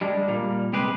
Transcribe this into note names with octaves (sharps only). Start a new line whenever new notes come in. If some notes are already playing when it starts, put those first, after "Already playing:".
G3 G#3 D4
A#2 G3 A#3
C3 G#3 G4 G#4 B4